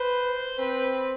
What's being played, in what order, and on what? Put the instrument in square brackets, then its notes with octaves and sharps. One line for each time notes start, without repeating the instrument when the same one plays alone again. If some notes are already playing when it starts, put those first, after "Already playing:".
Already playing: [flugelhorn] B4 [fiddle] C5
[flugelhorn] C4 [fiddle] B4